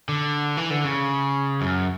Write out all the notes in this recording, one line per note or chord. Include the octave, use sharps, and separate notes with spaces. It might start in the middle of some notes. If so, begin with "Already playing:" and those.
D3
E3
D3
C#3
F#2